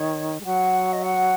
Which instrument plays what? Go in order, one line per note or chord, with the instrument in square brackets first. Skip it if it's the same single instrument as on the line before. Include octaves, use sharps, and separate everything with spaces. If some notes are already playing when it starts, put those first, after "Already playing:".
Already playing: [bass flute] D#3 [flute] C#5
[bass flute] G#3
[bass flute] F#3 [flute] F#5
[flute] D#5
F#5